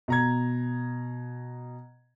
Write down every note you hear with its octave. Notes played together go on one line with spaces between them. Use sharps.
B2 A#5 G#6